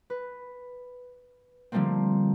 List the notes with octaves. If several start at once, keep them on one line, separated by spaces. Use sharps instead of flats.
B4
D3 F3 G3 A3 A#3 C4